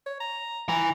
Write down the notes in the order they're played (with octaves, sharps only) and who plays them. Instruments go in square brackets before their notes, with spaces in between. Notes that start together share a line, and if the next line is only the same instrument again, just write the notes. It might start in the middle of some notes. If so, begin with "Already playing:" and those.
[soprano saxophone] C#5
A#5
[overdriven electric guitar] E3 [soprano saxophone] A#5